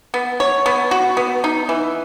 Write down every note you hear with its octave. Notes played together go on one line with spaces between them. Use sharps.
B3
C#5
B3
F#4
B3
D#4
E3